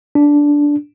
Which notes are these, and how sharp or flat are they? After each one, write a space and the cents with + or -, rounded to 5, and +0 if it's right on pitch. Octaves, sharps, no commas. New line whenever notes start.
D4 -10